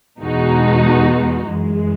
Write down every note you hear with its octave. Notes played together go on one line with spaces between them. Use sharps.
E2 B2 G#3 D#4 F#4
F#2 E3 G#3